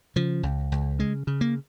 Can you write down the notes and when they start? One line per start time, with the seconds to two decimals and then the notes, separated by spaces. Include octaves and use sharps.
0.16 C#3 F3
0.43 C#2
0.72 C#2
0.99 C#3 G#3
1.27 C#3
1.41 A#3